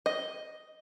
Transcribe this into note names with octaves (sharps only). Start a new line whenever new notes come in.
D#5